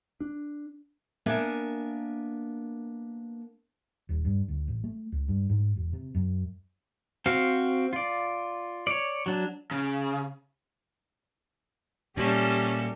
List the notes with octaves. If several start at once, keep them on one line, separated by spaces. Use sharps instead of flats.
D4
A#3 B3 D4 A#4 E5 G#5
D#1
G2
D2
A1
A3
C#2
G2
G#2
E1
C3
F#2
C4 F#4 F5
F4 D5
C#5 D5
F#3 D4
C#3
A#2 G3 C#4 A4 E5